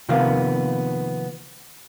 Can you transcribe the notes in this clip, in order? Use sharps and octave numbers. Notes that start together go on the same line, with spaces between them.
C3 D#3 F3 A#3 B3 F5